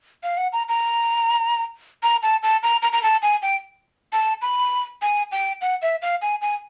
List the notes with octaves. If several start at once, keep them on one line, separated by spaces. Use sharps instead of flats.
F5
F#5
A#5
A#5
A#5
A5
A5
A#5
A#5
A#5
A5
G#5
G5
A5
B5
G#5
G5
F#5
E5
F5
G#5
G#5